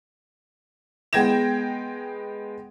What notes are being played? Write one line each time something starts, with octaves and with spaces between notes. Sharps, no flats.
G#3 B3 G5 G#6 A#6 E7